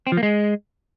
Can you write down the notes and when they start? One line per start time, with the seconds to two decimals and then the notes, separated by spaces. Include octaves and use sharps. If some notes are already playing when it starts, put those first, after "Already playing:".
0.07 C4
0.12 F3
0.17 A#3
0.23 G#3